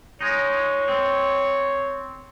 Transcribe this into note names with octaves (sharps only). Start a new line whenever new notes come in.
G#3 D#4 C#5
C4